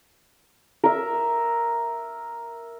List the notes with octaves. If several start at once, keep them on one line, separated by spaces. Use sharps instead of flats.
A#4 E5